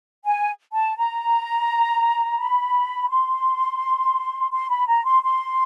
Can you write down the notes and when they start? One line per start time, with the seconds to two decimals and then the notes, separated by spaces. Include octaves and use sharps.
0.25 G#5
0.73 A5
0.96 A#5
2.39 B5
3.09 C6
4.52 C6
4.69 B5
4.87 A#5
5.05 C6
5.23 C6